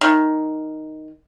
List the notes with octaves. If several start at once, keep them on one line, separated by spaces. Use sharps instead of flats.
D#3